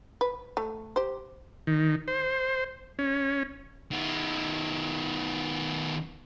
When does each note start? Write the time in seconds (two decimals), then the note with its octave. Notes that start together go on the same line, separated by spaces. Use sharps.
0.21 B4
0.57 A3
0.96 G4 C5
1.67 D#3
2.08 C5
2.99 C#4
3.91 D#3 B3